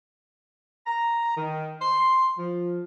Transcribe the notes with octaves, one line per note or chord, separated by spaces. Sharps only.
A#5
D#3
C6
F3